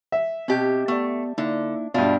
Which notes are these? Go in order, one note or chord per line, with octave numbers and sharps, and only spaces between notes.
E5
B2 C4 G4 D#5 A5
A3 B3 G4 D5
D3 A#3 D#4 E4
G2 B2 D4 F4 F#4 E5 A5